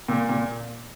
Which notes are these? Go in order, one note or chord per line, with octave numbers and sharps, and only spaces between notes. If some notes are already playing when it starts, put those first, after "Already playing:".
A#2
A#2